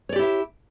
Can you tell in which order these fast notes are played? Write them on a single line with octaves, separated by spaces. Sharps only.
C#5 D5 G4 E4 E5